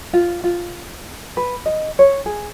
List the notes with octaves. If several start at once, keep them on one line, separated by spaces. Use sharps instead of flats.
F4
F4
B4
D#5
C#5
G#4